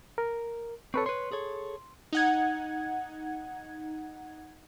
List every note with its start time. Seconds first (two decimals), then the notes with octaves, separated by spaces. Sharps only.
0.18 A#4
0.94 C4 A4 B4 C#5 C#6
1.06 B4 C#5 C6
1.32 G#4 A4 C#5
2.13 D#4 F#5 G#6